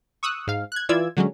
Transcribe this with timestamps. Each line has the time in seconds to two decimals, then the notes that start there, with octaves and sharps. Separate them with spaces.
0.23 C#6 D#6 E6 F#6
0.47 G#2 F5
0.72 F#6 G#6
0.89 E3 F4 D5 E6 G#6
1.17 D3 F#3 G#3 C#4